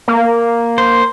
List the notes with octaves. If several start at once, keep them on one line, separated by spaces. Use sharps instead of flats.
A#3
C5